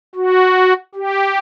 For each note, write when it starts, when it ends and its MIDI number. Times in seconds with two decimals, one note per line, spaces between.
0.15 0.73 66
0.95 1.39 67